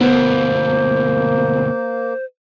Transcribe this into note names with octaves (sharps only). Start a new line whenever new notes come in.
D2 B2 A#3 B3 C5